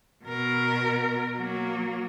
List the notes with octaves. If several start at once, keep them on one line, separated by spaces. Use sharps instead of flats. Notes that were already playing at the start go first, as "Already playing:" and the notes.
B2 A#4
F#3 A#3